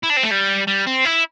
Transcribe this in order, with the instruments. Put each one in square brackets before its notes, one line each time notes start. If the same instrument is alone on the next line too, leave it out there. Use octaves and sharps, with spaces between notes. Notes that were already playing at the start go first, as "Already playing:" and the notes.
[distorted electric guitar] E4
D4
C4
A3
G3
G3
C4
E4